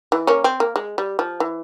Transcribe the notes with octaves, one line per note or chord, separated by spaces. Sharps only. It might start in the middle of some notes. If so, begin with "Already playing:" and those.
E3
A#3 C#4
C4
A#3
G#3
G3
F3
E3